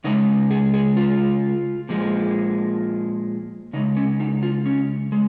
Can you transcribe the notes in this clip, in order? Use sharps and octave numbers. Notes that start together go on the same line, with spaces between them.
C#3 G#3 D#4
G#4
G#4
F4
A#2 F3 G#3
C#3 G#3 D#4
C#4
D#4
F4
C#4
G#3